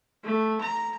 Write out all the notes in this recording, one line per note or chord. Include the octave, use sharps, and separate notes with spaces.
A3
A#5